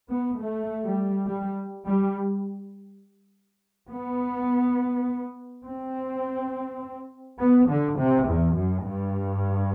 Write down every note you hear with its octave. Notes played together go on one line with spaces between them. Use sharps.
B3
A3
G3
G3
G3
B3
C4
B3
D3
C3
E2
F#2
G2